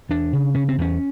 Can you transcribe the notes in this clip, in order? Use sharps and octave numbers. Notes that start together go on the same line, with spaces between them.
E2 D4
C#3
C#3 C#4
C4
E2 C#4